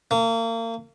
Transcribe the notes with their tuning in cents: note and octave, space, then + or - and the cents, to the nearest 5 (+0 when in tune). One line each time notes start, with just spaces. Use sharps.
A#3 -35